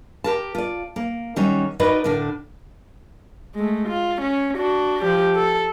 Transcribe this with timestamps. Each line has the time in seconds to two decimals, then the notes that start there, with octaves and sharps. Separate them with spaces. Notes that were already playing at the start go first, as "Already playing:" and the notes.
0.24 G4 A#4 A5
0.55 F4 D5
0.96 A#3
1.36 D#3 F#3 G3 C#4
1.80 D#4 F#4 A#4 B4 D5 D#5
2.04 A2 D3 D4 A#4
3.55 G#3 A3
3.88 F4
4.21 C#4
4.57 D4 F#4
5.02 F3 G4
5.36 A4